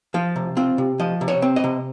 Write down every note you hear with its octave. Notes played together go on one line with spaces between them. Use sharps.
F3 F4
C3
C4 F4
C3
F3 D#5
C3
C#5
C4
D#5
C3